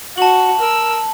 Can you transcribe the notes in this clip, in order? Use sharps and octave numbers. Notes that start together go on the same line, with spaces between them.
F#4 A5 C#6 F#7
A#4 E6